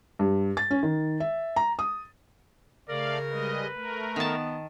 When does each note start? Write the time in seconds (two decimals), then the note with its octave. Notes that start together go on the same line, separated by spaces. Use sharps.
0.19 G2
0.57 A6
0.71 C#4
0.83 D#3
1.20 E5
1.56 A#5
1.79 D#6
2.89 C#3 A3 A#4 D5 F5
3.30 G3 G#3 B4 D#5
3.74 A3 A#4
4.16 D#3 B3 A5